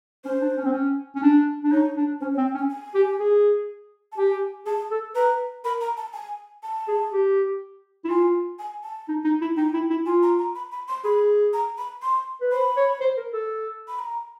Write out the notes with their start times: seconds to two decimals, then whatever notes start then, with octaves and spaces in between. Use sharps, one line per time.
0.25 C#4 C5
0.41 D4
0.57 C#4
0.65 C4
0.73 C#4
1.15 C#4
1.23 D4
1.64 D4
1.72 D#4 C#5
1.97 D4
2.21 C#4 C5
2.34 C#5
2.37 C4
2.46 G5
2.54 C#4
2.58 G#5
2.70 G#5
2.95 G4
3.20 G#4
4.12 A5
4.18 G4 G#5
4.66 G#4 A5
4.91 A4
5.15 B4 A#5
5.65 A#4 B5
5.81 A#5
5.97 A5
6.14 G#5
6.63 A5
6.88 G#4
7.12 G4
8.04 E4
8.10 F4 G#5
8.59 G#5
8.84 A5
9.08 D#4
9.24 D#4
9.41 E4
9.57 D#4 G5
9.74 E4
9.90 E4
10.06 F4 G#5
10.23 A#5
10.39 A#5
10.55 B5
10.72 B5
10.88 C6
11.04 G#4 B5
11.53 A#5
11.78 B5
12.02 C6
12.41 B4
12.52 C5 B5
12.77 C#5
13.00 C5
13.17 A#4
13.33 A4
13.88 B5
13.99 A#5